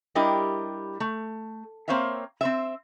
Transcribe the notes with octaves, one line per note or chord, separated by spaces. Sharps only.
G3 D4 E4 G4 A#4 D#5
A3
A#3 C4 C5 C#5 E5 F5
C4 C5 E5